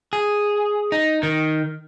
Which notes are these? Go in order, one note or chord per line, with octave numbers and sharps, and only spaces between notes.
G#4
D#4
D#3